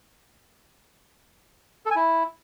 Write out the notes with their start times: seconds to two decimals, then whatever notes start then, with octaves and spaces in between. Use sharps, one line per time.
1.86 A4
1.91 G#5
1.96 E4